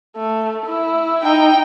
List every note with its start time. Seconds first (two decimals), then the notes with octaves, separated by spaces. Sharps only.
0.16 A3
0.66 E4
1.22 D#4 G5